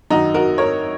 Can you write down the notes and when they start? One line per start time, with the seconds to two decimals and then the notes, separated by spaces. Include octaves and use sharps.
0.10 F#2 D#3 D#4 F#4
0.34 F#4 A#4
0.58 A#4 C#5